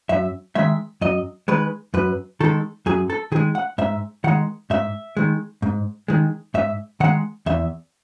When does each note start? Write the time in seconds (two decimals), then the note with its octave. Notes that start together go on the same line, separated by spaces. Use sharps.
0.09 F#2 E5
0.55 D#3 G#3 E5
1.01 F#2 D#5
1.48 D#3 G#3 B4
1.94 F#2 B4
2.40 D#3 G#3 A4
2.86 F#2 G#4
3.10 A4
3.32 D#3 G#4
3.36 G#3
3.55 F#5
3.78 G#2 E5
4.24 D#3 G#3 F#5
4.70 G#2 E5
5.17 D#3 G#3
5.62 G#2
6.08 D#3 G#3
6.54 G#2 E5
7.00 D#3 G#3 F#5
7.46 E2 E5